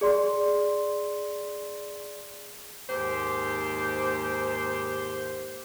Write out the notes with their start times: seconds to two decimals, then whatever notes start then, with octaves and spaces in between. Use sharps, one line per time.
0.01 G#4 D5 C6
2.90 D#2 G#2 G4 C5